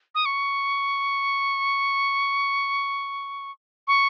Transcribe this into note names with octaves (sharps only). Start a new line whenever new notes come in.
D#6
C#6
C#6